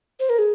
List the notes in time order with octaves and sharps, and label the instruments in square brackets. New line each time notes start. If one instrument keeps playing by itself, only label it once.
[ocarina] C5
A#4
G#4